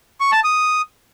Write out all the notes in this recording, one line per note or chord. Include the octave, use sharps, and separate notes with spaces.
C#6
A5
D#6